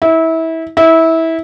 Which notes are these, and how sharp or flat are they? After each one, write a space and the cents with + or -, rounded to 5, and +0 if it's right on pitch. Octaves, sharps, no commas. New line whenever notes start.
E4 -25
E4 -20